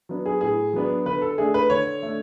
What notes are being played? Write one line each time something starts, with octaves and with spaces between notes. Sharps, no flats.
F#3 B3 D4
G#4
A2 G#4
F#3 B3 D4
D3 B4
A4
A3 D4 G#4
B4
D3 C#5
A3 D4